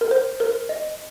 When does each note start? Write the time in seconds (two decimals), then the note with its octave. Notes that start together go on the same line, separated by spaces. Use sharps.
0.01 A#4
0.11 C5
0.40 A#4
0.69 D#5